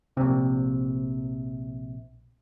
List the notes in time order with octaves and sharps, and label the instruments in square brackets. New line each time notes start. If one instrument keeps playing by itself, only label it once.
[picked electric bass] A#1 C3